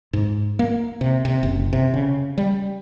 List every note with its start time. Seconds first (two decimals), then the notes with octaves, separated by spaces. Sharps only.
0.13 G#2
0.59 A#3
1.01 C3
1.25 C3
1.43 F#1
1.73 C3
1.94 C#3
2.38 G3